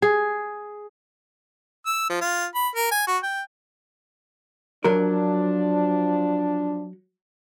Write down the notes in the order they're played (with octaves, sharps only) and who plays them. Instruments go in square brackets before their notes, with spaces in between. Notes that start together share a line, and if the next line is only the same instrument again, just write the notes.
[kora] G#4
[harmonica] E6
F3
F4
B5
A#4
G#5
F#4
G5
[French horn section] F3 D4 [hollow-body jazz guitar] F#3 A#4